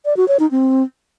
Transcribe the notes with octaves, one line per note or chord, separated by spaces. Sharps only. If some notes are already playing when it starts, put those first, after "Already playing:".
D5
F#4
C#5
D#4
C4